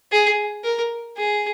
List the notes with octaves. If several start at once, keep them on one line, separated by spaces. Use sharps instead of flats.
G#4
A#4
G#4